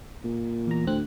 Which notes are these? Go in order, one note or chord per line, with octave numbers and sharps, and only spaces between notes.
A#2
E2 A#5
D2 A2 C4 F#6